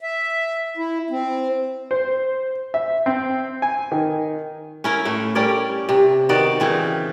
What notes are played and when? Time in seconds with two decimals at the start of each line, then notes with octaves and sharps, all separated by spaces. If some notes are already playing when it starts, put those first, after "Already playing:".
0.01 E5
0.77 E4
1.10 C4
1.91 C5
2.74 E5
3.06 C4
3.62 G#5
3.92 D#3
4.84 C#4 E4 A#4
5.05 A2 A3
5.35 G3 C#4 A#4 D5
5.89 C3
6.29 D#3 B3 F#4 D5
6.60 C#3 E3 C4